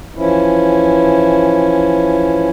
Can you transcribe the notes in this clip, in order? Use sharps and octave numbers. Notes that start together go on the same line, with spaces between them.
E3 F3 C#4 E4